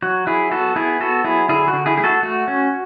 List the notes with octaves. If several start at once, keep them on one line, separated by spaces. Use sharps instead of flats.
F#3 F#4
F#3 E4 G#4
B3 F#4 A4
B3 E4 G#4
B3 F#4 A4
F#3 E4 G#4
D3 E4 G#4
F#4
D3
E4 G#4
A3 G#4
F#4 A4
A3 F#4
C#4